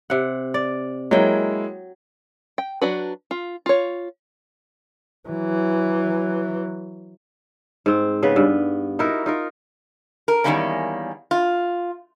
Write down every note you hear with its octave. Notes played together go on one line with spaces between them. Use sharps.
C3 F#5
D5
F#3 G#3 A#3 E4 G5
G5
F#3 D4 F#4 B4
F4
F4 C#5
E3 F#3
G#2 C4
C#3 B3 B4
G2
D#4 E4 F#4 A#4
D#4 F4 A#4
A#4
E2 G#2 D#3 G3 A#3 C#4
F4